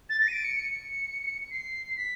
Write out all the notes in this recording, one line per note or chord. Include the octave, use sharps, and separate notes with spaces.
A6
A#6
D#7
D7
C#7
C#7
C7
B6